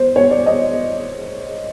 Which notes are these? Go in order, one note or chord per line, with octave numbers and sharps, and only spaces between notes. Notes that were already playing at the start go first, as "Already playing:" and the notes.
Already playing: C5
C#5
D5
D#5